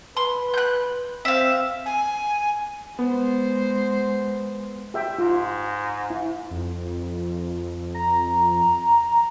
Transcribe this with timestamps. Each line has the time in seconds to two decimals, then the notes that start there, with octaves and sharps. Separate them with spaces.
0.17 B4 C6
0.54 F#6 G6
1.25 C4 E5 F5
1.86 G#5
2.99 G#3 B3 C5
4.94 G4 E5 G5
5.18 G#2 F4
6.10 E4
6.50 F2
7.95 A#5